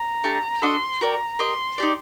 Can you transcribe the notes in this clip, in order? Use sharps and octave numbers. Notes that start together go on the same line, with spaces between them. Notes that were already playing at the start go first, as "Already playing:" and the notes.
Already playing: A#5
A3 D4 G4
D4 F#4 A4 D#5 C6
F#4 A#4 D5 G5 A#5
G4 A#4 D#5 C6
D#4 G4 D5